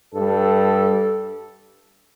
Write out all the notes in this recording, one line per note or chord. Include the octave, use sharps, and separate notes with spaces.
G2 G3 A4